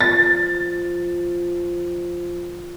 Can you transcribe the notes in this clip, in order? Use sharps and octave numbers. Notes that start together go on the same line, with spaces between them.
F3 A6